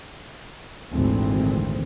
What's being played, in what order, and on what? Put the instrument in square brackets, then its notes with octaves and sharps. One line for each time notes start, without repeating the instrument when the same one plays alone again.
[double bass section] G#1 D2 A#2 E3 C4